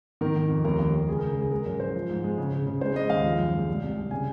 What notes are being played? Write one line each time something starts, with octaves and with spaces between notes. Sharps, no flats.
D#3 A#4
D#3
F2
D#2 A#4
D#2
D#2
C#2 G#4
A#4
C#3
C#2 G#4
G#3 A#4
F#2 A#4
F#2 C5
F3
G#2
G#3
C#3
C#3
C#3
G#3 C5
G#3 D#5
D#2 F5
F3
F#2
G#3
C2
C2
C2
C#3 G#5